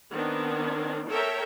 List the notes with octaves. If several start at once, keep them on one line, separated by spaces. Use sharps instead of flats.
D#3 B3 C4 D4
A4 A#4 C#5 E5 G5 A#5